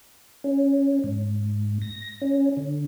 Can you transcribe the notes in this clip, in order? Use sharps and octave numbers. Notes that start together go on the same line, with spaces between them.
C#4
G#2
A#6
C#4
D3